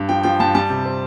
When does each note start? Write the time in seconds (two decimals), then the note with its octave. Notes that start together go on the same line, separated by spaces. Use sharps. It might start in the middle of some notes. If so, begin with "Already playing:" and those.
Already playing: G2
0.09 F3 G5
0.23 F3 G5
0.40 G2 A5
0.55 G3 A5
0.70 C3
0.86 C4